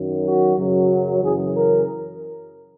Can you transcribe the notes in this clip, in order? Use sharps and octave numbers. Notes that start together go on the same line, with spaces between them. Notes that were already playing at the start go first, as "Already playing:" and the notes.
Already playing: F#2 D#3 F#3
F#4
F#2 C#3 F#3
F#2 C#3 E3 G#4
A#4